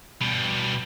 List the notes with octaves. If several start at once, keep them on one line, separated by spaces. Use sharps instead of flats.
B2 G3